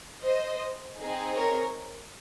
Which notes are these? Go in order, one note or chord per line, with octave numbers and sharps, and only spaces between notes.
C5 D#5
C4 D#4 G#4
A#4 C#5